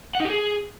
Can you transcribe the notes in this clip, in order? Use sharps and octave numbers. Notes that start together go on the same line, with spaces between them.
F#5
D#4
G4
G#4